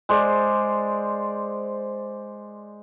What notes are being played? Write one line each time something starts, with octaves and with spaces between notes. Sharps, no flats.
G#3 C5 D5